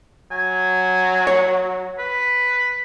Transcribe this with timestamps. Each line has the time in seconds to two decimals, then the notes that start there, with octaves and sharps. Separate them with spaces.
0.32 F#3 G#5
1.27 C#5
1.99 B4